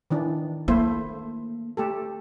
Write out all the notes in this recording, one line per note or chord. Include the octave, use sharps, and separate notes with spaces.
D#3 E3 D4
A3 A#3 E4 C5
A3 G4 A4